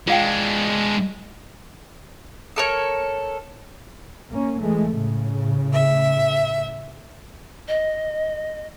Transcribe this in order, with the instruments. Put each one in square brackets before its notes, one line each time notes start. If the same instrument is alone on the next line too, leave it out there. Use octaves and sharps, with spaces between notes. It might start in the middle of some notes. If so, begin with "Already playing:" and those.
[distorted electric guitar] G#3 D4 [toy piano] F4 F5 G5
[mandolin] A4 A#4 C#5
[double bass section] A#3 C#4
E3 G#3 A3
A2 C#3
[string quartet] E5
[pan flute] D#5